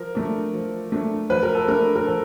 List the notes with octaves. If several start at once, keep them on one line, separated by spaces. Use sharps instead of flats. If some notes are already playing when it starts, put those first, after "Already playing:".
Already playing: F3 A#4
A3 D4
F3
A3 D4
F3 B4
A#4
A4
A3 D4 A#4
A#4
F3 A4